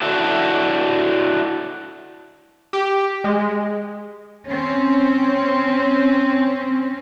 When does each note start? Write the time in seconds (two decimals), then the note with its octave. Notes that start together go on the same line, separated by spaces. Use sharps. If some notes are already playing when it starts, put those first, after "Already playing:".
0.02 D4 E4 F#4 A4
2.73 G4
3.24 G#3
4.48 C4 C#4